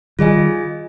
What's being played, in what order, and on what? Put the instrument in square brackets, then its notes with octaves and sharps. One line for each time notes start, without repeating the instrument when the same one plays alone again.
[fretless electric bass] D#3 G3 [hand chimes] F4 G#4 D#5 G#5